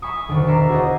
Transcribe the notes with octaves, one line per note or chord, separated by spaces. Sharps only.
E5 G#5 B5 C#6 D#6
E1 D2 D#3 C#4 C#7
D5 E5 A#5 C6
F#4 G#4 C5 C#5 D#5